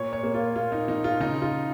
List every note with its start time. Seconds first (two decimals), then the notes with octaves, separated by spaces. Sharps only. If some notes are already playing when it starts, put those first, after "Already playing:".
Already playing: A#2 C#5
0.13 C#5
0.23 A#3
0.34 F4
0.56 A#2 F4
0.72 D#4
0.88 F3 D#4
1.04 F4
1.20 C#3 D#4
1.42 F4